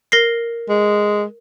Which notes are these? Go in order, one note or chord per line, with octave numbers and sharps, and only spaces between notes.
A#4 A#6 C7
G#3